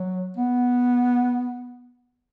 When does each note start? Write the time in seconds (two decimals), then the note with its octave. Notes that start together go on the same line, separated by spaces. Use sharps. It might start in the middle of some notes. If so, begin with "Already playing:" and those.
Already playing: F#3
0.37 B3